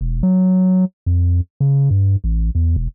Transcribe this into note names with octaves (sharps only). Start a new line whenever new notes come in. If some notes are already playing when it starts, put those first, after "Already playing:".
E1
F#3
F2
C#3
G2
A1
E2
E1